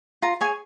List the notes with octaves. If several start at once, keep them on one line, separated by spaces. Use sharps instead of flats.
F4 A#5
G#4 C#5 G#5